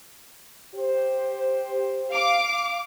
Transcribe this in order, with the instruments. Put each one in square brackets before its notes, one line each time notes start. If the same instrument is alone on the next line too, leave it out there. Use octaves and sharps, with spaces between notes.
[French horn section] G4 C5
[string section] F5 D6